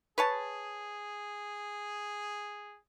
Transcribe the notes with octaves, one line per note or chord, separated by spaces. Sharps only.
G#4 B4 C#5 A5